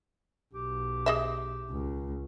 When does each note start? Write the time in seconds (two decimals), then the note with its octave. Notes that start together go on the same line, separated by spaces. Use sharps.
0.54 B1 G4
1.06 G#4 D#5 E5
1.70 C#2